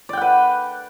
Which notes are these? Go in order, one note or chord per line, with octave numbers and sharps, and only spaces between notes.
B4 D5 F#5 G5